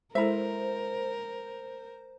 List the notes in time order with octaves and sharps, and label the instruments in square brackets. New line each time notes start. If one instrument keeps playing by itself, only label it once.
[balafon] G#3 E4 A4 [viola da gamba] A#4 [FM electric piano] C5 [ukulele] E5 A#5